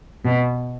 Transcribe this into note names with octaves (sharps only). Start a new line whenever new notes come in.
B2